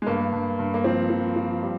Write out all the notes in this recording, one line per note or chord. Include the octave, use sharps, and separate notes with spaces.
G#3
G2 A#3
G2
G2
A#3
F3 C4
F3
F3
G3